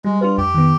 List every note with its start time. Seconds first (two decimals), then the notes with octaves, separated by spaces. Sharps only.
0.05 G3 G#3
0.21 D4 F4 G4 B4
0.38 F2 G4
0.54 D#3 B3